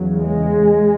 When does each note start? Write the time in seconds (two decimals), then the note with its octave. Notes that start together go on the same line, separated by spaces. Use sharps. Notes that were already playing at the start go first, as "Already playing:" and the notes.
Already playing: E2 C#3 F#3
0.24 G#3